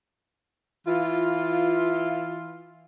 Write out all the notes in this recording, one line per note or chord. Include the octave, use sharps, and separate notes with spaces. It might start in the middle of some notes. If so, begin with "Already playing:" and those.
E3 E4 F4